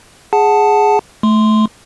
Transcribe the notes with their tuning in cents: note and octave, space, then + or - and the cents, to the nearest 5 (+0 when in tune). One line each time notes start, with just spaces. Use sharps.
G#4 +0 F#5 +0 A5 +0
A3 -20 C6 -10